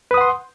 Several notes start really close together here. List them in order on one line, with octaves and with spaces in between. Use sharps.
B4 D#6 F#5 C6